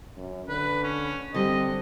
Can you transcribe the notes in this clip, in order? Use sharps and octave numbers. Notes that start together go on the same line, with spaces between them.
F#2
D3 B4
C#4
D3 G3 C4 D#5